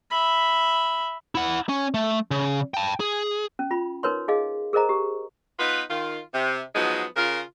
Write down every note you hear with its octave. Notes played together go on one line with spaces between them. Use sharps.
E5 B5
E4 F#5
C#4
A3
C#3
G5 A5
G#4
C#4
F4 B5
D#4 A#4 B4 C#5 C6
D#4 G#4 D#5 F5
G#4 A#4 C5 D#5 A#5
G4
B3 D#4 F4 B4
D#3 F4
C3
F3 F#3 G#3 B3 D#4
C#3 F4 A#4